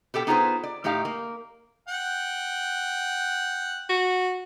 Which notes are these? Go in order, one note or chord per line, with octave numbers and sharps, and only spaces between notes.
B2 G4 A4 G5
B3 D#4 F4 G#4 B4 C5
D5
A2 A3 D#4 G4 F5
A#3
F#5 G5
F#4